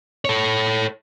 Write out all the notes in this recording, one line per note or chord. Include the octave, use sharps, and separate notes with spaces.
A4 C#5